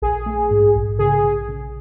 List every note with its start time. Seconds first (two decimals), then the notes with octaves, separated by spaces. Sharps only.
0.02 A#1 G#4
0.26 A3
0.51 G#2
0.76 A#1
0.99 C#3 G#4
1.24 C#3
1.49 C#3